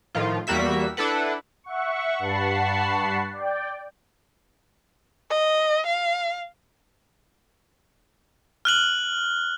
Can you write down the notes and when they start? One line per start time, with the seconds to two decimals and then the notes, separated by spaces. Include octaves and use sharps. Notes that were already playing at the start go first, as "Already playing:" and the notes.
0.15 A2 D#3 F3 F4
0.47 E2 G3 A#3 F#4 E5 B6
0.97 D4 E4 A4 B4 F#5
1.64 E5 F#5 C#6
2.19 G2 F#5 A5 B5 C#6 C7
3.33 D5 G5
5.30 D#5
5.87 F5
8.65 F6 F#6 F#7